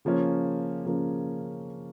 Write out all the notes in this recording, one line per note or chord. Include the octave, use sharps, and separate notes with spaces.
C#3 F3 A#3 C#4
C#3 F3 A#3 C#4